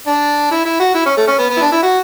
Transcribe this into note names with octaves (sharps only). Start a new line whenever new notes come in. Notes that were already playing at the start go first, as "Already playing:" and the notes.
D4
E4
E4
F#4
E4
C#4
A3
C#4
B3
B3
E4
D4
E4
F#4